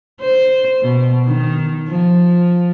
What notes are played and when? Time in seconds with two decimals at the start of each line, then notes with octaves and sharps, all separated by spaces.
0.21 C5
0.82 B2
1.25 D#3
1.88 F3